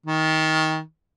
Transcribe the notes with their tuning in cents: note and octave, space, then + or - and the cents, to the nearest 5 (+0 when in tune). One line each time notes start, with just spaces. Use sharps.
D#3 +20